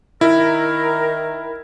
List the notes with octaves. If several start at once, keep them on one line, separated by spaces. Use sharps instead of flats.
D#3 E4 A#4